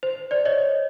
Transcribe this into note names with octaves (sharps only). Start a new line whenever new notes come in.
C5
C5 D5
C#5 D#5